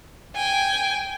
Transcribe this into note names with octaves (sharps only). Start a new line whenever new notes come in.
G5 G#5